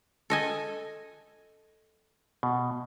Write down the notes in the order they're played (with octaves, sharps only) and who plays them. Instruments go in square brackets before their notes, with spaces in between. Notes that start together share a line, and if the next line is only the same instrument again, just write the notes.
[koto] A4 D#5 G#5
[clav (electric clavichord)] B2